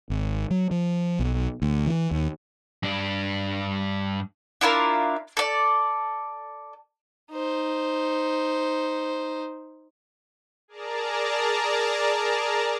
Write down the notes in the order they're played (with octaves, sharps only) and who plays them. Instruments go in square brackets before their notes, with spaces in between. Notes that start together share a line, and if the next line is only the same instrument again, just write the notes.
[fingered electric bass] G#1
F#3
F3
B1
D2
E3
D#2
[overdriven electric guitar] G2 D4
[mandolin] D4 E4 F4 A#4
A4 D5
[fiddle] D#4 C5
[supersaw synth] G#4 A#4 D5 A5 A#5